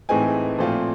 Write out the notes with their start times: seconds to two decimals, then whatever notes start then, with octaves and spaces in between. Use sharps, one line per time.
0.09 A2 E3 G#3 C4 D#4 G#5
0.58 A#2 F3 A3 C4 F4